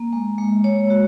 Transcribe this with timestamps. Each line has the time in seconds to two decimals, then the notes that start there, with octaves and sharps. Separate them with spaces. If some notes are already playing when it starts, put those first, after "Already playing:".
Already playing: A#3
0.13 G#3
0.38 G#3
0.64 G#3 C#5
0.90 F#4